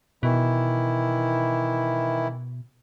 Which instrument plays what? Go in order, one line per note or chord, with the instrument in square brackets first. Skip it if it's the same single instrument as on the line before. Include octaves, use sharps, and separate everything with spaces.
[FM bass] B2 [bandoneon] D#3 E3 E4